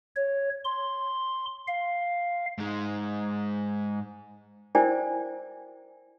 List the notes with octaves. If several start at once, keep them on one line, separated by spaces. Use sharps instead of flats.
C#5
C6
F5
G#2 G#3
E4 A#4 C5 D5 G5 G#5